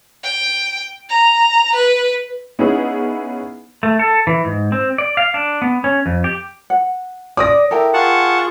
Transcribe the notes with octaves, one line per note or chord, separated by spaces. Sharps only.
G5
A#5
B4
B3 C#4 D#4 E4 G#4
A3
A4
E3
G#2
C4
D5
F5
D4
B3
C#4
F2
G4
F#5
D5 D6 D#6 A#6
E4 A4 A#4 G5
F4 G#4 F#5 A5 C#6